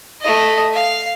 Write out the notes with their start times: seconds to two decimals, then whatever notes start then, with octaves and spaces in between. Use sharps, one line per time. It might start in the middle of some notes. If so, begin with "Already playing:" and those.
0.21 A3 D#5
0.73 F5